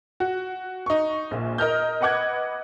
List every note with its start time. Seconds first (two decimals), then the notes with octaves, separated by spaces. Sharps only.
0.20 F#4
0.86 D#4 C#6
1.31 A#1 A#2
1.58 A#4 D#5 F6 G6
2.01 B4 D#5 F#5 D6 F#6 G#6